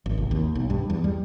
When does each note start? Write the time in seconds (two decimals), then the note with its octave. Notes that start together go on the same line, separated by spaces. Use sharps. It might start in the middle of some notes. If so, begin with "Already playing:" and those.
0.06 G#1
0.18 C2
0.31 D#2
0.55 B1
0.70 G2
0.90 E2
1.04 G3